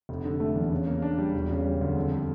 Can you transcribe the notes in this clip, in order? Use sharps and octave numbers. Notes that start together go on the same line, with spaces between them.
F1
D3
A3
E2
C#3
A#3
D4
G3
E1
C#3
G3
D2
F2
G3